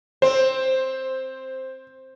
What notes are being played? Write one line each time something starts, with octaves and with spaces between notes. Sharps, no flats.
C4 C5